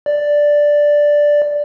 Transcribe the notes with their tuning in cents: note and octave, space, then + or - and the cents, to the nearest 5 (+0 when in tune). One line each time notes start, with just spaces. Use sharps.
D5 +0